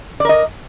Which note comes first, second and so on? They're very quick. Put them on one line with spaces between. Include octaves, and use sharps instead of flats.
D5 A#4 D#5